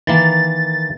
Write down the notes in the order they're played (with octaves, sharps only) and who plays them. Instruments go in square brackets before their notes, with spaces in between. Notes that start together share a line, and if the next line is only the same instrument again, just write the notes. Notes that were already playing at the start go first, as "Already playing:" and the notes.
[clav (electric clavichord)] D#3 E3 A#3 [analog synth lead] A6